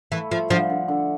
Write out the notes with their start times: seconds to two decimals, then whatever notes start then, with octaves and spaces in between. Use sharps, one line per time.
0.12 E3 A3
0.31 F3 A3
0.50 D3 F3
0.70 D3
0.88 D3